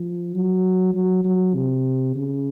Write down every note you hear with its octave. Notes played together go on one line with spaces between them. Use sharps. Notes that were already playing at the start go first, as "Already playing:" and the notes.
Already playing: F3
F#3
F#3
F#3
C3
C#3